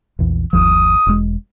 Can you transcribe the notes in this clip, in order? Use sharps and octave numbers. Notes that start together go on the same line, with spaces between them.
A#1 E2
G1 D#2 F3 D#6
E1 G#3